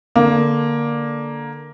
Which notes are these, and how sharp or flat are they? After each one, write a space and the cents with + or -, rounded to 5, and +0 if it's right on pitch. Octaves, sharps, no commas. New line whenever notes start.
D3 +0 A#3 +10